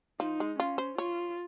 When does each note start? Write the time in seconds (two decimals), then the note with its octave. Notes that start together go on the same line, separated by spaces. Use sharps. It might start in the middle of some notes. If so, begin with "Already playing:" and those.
0.20 F3 D#4
0.40 G#3
0.59 C#4 F4
0.78 C5
0.98 F4 C#5